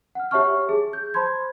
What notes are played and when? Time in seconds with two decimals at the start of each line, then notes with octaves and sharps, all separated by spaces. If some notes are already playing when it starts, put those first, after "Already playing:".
0.15 F#5 F6
0.31 G4 C#5 E5 A5 C#6 F6
0.69 G#4
0.93 G6
1.14 C5 A5 B5 C6 G#6